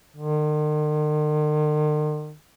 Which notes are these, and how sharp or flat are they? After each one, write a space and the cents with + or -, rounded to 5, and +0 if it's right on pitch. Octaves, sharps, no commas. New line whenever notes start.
D#3 -45